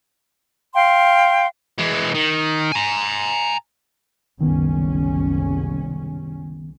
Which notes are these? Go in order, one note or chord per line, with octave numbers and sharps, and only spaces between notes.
F5 G5 C6
E3 G#3
D#3
G#5 A#5
F#1 C2 D#3 B3 C#4